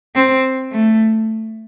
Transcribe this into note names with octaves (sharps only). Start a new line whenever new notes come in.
C4
A3